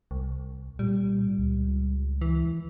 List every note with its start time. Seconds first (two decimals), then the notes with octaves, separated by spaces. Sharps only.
0.11 C2
0.79 A#2 G3
1.39 C#2
2.21 E3